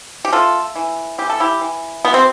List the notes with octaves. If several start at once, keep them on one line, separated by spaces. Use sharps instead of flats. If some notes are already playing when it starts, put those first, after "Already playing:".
G4
A3 F4 A4
E3
E3 G4
A4
E4 G4
E3
B2 B3
C4